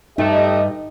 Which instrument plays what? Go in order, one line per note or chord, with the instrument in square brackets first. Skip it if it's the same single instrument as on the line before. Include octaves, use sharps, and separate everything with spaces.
[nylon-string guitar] G2 [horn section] A3 [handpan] D#4 [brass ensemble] G4 D#5 E5